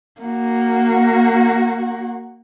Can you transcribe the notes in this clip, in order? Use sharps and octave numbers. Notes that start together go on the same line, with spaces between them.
A#3 F#4